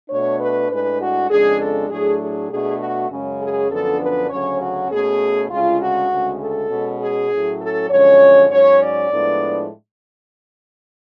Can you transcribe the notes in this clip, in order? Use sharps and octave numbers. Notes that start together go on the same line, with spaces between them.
B2 A3 D4 C#5
B4
A2 G#3 D4 B4
F#4
F2 C#3 G#3 D4 G#4
A4
A2 F#3 A3 D4 G#4
G#4
B2 A3 D4 G#4
F#4
F#2 C#3 G#3 C#4
G#4
F#2 D3 F3 B3 D4 A4
B4
D2 C#3 F#3 C#4 C#5
F#4
B2 A3 C#4 G#4
D2 C#3 G#3 F4
F#4
D2 C#3 G#3
A4
B2 G#3 C#4
G#4
A2 F#3 C#4
A4
F#2 D3 F3 G#3 C#4 C#5
G#2 F#3 C#4 C#5
D5
A2 F3 G#3 B3 D4